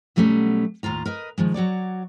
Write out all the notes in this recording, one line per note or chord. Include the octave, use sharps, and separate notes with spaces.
B2 F#3 G3 A3 B3 C#4
D#2 A2 F4 A#5
A#4 B4 D#5
D#3 F3 G#3
F#3 F#4 C#5 D5